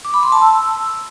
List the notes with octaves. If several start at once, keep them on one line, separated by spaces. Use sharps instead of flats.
D6
B5
C6
A5
E6